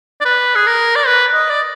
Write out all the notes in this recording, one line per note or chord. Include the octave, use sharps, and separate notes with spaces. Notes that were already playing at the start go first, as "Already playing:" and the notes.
D5
B4
G#4
A#4
D5
B4
D#5
D5